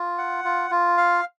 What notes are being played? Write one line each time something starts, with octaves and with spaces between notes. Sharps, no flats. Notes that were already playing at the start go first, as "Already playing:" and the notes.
Already playing: F4
F#5
F4
F4
F5